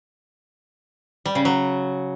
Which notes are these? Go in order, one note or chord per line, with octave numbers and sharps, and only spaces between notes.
G3
C#3
F#3